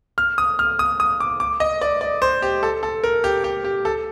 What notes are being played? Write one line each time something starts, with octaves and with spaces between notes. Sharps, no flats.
F6
D#6
F6
D#6
D#6
D6
D6
D#5
D5
D5
C5
G4
A4
A4
A#4
G4
G4
G4
A4